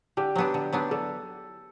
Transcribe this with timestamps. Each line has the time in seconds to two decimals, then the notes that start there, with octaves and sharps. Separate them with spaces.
0.17 D3 G4
0.36 F#3 B3 D4
0.54 D3
0.73 F#3 B3 D4
0.91 D3 A4